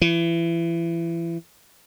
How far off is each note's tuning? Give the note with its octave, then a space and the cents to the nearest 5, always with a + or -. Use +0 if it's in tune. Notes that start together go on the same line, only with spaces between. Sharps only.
E3 +30